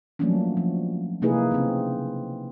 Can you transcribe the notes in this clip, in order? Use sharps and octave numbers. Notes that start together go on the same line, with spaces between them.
F3 F#3 A3 A#3 C#4 D4
F3
C3 A#3 D#4 E4 G#4 B4
C#3 C4